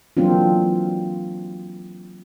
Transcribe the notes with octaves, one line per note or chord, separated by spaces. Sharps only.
E3 F#3 A#3 C4 D4 F4